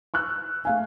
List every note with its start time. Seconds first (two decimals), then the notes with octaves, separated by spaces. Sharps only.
0.14 C#6 E6 F#6
0.65 A3 F5 G#5